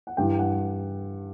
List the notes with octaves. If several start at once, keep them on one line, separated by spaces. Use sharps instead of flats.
F#5
G2 E3 G5
F#5